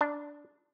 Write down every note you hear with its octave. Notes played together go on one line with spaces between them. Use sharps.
D4